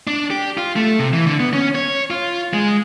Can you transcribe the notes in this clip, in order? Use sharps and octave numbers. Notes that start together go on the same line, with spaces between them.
D4
G4
F4
A3
C3
E3
D3
B3
C#4
C#5
F4
G#3